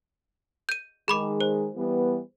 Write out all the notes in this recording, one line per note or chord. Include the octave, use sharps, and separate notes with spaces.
G6 D#7
D#3 G#3 G#4 B5 D6
C5
E3 G3 B3